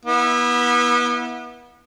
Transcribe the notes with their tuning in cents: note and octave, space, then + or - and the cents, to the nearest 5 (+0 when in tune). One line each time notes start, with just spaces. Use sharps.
B3 -25 E4 -15